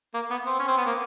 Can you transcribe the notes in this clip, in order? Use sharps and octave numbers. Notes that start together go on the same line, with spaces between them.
A#3
B3
C4
C#4
C4
B3
A#3